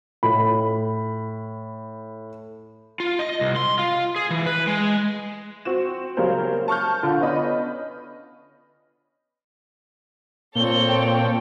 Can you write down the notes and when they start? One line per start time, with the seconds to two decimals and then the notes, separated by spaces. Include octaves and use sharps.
0.23 A2 B5
3.00 F4
3.19 D#5
3.41 C2
3.56 C6
3.79 F4
4.16 G#4
4.30 E3
4.46 B4
4.67 G#3
5.65 C4 F#4 E7
6.17 C#3 F#3 G3 A#3 A#4 C5
6.68 A5 C#6 F6 G6
7.03 D3 F4
7.20 B3 C#4 D4 D#5 B5
10.55 A#2 C4 A4 C#5 G7
10.88 G5